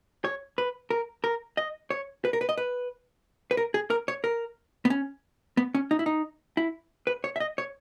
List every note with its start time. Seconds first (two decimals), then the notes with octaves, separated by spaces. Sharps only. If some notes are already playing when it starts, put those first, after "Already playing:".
0.24 C#5
0.58 B4
0.90 A#4
1.24 A#4
1.57 D#5
1.90 C#5
2.25 B4
2.33 A#4
2.41 B4
2.49 D#5
2.58 B4
3.51 B4
3.57 A#4
3.74 G#4
3.90 A#4
4.08 C#5
4.24 A#4
4.85 B3
4.90 C#4
5.57 B3
5.74 C#4
5.91 D#4
5.99 E4
6.06 D#4
6.57 E4
7.07 B4
7.24 C#5
7.36 E5
7.40 D#5
7.58 C#5